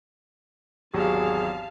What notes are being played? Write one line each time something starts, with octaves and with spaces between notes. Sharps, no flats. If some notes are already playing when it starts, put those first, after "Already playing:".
G#1 E2 F#3 G4 G#4 F5 A5